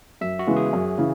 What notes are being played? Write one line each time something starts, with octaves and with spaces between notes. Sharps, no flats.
F#2 E5
F#4
C#3 E3 G#3 B3
G#4
F#2
C#3 E3